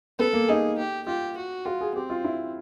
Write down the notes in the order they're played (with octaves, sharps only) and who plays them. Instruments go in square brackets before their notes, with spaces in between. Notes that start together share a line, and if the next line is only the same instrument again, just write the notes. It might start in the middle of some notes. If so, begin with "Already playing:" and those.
[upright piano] B3 [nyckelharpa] A4
[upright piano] A#3
[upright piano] D#4 [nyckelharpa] G#4
[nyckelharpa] G4
[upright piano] F4 [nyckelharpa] G4
[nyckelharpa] F#4
[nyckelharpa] F4 [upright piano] F#4
[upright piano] G#4
[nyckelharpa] C4 [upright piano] G4
[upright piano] F4
E4